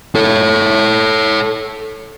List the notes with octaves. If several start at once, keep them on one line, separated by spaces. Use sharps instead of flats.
A4 C#5